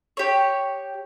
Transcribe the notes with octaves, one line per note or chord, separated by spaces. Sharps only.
G4 C#5